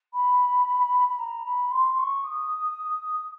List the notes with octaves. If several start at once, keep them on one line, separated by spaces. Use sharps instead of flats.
B5
B5
A#5
B5
C6
C6
C#6
D#6